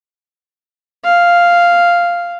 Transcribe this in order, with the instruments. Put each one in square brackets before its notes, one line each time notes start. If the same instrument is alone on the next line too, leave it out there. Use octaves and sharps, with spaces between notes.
[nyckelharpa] F5